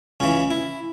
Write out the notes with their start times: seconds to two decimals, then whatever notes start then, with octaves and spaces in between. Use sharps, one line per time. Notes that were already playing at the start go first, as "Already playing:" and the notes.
0.20 C#2 C#3 E3 C#4
0.50 E4